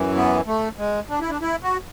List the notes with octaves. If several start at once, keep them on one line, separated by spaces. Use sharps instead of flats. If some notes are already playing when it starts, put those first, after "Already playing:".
Already playing: F#2 E3
B3
A3
G#3
D4
E4
D4
E4
F#4